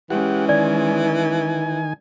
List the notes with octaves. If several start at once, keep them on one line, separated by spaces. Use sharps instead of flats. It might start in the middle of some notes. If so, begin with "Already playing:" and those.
E3 G#3 C#4 G4 F#5
D#3 D5 G#5